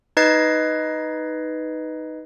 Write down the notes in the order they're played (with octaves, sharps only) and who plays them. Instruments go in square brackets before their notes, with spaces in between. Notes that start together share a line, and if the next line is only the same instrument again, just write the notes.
[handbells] D#4 B4 D#5 G#6 A6 C7